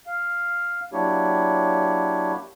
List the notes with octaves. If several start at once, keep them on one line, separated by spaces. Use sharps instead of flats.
F5
F#3 A#3 D4 E4 G4 C#5